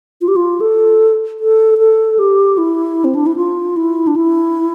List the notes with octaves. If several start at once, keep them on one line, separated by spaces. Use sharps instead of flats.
F4
G4
F4
A4
A4
A4
G4
E4
C4
D4
E4
F4
E4
D4
E4